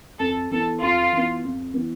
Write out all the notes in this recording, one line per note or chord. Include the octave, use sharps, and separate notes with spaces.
F2 A4
E3 B3 A4
F2 F4
E3 B3
F2
E3 B3